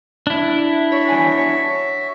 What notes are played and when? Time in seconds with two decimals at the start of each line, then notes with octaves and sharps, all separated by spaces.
0.27 D4 E4
0.92 F#4 C#5 E5
1.09 E2 G3 G#5
1.38 C#5